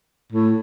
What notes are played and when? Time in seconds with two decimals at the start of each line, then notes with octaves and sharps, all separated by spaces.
0.32 A2